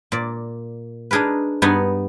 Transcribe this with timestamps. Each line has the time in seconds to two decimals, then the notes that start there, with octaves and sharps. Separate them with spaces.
0.12 A#2 D5
1.11 D4 D#4 G#4 A#4 B4
1.62 G2 B3 D#4 B4 F#5 G#5